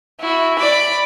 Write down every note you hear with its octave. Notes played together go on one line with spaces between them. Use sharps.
E4 F#4
D5 B5